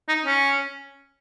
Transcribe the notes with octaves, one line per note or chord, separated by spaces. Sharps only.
D#4
C#4